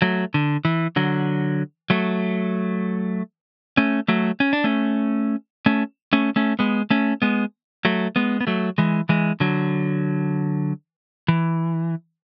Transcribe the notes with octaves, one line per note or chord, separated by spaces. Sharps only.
F#3 A3
D3
E3
D3 F#3
F#3 A3
A3 C#4
F#3 A3
C#4
D4
A3 C#4
A3 C#4
A3 C#4
A3 C#4
G#3 B3
A3 C#4
G#3 B3
F#3 A3
G#3 B3
B3
F#3 A3
E3 G#3
E3 G#3
D3 F#3
E3